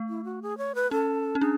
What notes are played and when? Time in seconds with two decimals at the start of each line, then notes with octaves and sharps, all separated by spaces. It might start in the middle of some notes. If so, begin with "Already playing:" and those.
Already playing: A3
0.09 E4
0.25 F#4
0.42 G#4
0.58 C#5
0.75 B4
0.91 C#4 A4
1.35 C#4
1.41 D4 G#4